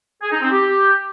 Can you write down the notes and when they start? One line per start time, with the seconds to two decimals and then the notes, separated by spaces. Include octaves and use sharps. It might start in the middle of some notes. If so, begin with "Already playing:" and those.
0.22 G#4
0.32 D#4
0.41 C4
0.51 G4